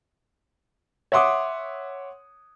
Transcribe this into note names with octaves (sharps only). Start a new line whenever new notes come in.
C#5 E5 F#5 C6 D6 D#6